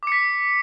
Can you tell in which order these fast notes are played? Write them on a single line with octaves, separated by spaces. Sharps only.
D6 C#7 B6